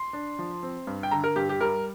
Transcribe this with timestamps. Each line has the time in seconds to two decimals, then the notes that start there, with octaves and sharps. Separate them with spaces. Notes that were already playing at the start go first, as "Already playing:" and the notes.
Already playing: C6
0.13 D4
0.39 F3
0.63 C4
0.87 G2
1.03 G5
1.11 D3 A#5
1.24 A#4
1.36 G2 G4
1.49 G4
1.60 G3 A#4